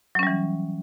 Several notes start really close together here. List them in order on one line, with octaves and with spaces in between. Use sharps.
F#3 C#4 G3 E3